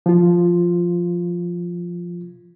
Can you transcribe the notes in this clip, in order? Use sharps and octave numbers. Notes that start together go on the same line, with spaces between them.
F3 F4